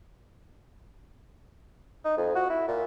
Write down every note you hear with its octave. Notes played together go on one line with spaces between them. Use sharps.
D#4
F2
F#4
E4
A#2